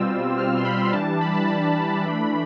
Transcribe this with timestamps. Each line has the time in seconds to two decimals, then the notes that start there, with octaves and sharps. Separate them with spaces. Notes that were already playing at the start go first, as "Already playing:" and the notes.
Already playing: B2 G3 C4 F4 E6
0.38 F6
0.58 C6
0.65 B5
0.84 B5
0.93 E3 G3 D4 A5
1.21 B5
1.34 A5
1.48 B5
2.04 E3 A3 D4